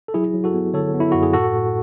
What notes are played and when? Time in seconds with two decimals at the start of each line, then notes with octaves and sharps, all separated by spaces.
0.08 A4
0.14 F#3 E4 G#4
0.34 F#3
0.44 F#4 A4
0.54 B3
0.74 D3 A4 C#5
0.94 B3
1.00 E4
1.12 F#2 F#4
1.23 G#4
1.33 A2 F#4 A4
1.53 A2